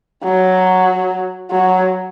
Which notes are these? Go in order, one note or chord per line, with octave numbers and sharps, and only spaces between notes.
F#3
F#3